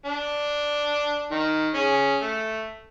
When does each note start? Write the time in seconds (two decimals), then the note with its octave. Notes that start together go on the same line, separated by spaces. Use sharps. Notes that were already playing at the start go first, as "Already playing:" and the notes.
0.05 D4
1.31 D#3
1.74 C#4 G#4
2.22 A3